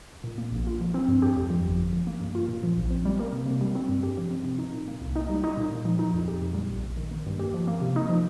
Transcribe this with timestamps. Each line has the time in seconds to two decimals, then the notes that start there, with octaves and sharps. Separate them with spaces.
0.24 A#2
0.38 A#3
0.52 A#1
0.67 F4
0.81 F3
0.94 C4
1.08 G2
1.22 G4
1.37 F2
1.50 F3
1.65 G1
1.78 G1
1.93 F3
2.07 A#3
2.21 G2
2.35 F4
2.48 A#2
2.63 F3
2.77 A#1
2.91 C4
3.05 G3
3.19 A#3
3.33 C3
3.46 C3
3.61 G3
3.75 C4
3.89 G2
4.03 G4
4.17 F3
4.31 C4
4.45 C3
4.58 D#4
4.73 A#2
4.88 A#3
5.01 C2
5.16 D#4
5.30 G3
5.44 D#4
5.57 A#2
5.71 A#2
5.85 F3
5.99 D#4
6.14 F2
6.28 G4
6.41 A#2
6.55 G3
6.70 A#1
6.84 A#1
6.97 D#3
7.11 A#3
7.26 G2
7.39 G4
7.54 F3
7.67 A#3
7.82 C3
7.96 D#4
8.09 F3